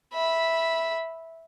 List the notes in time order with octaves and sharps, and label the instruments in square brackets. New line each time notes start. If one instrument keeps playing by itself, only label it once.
[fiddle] E5 B5